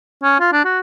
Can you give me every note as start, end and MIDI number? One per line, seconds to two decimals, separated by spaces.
0.23 0.38 61
0.40 0.50 65
0.53 0.63 62
0.65 0.80 66